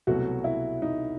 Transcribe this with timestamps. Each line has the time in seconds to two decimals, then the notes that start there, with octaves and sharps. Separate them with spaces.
0.07 C2 B2 F#3 A3 F#4
0.44 E4
0.82 D#4